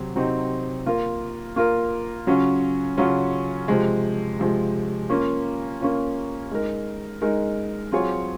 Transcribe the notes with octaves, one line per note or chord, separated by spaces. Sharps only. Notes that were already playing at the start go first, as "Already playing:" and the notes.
Already playing: C3 F#3 C4
C3 F#3 C4 D#4
A#3 F4 A#4
A#3 F4 A#4
C#3 F#3 C#4 F4
C#3 F#3 C#4 F4
C3 F3 G#3
C3 F3 G#3
A#3 C#4 F4
A#3 C#4 F4
G#3 D#4 A#4
G#3 D#4 A#4
F#3 C4 F4 G#4 C#5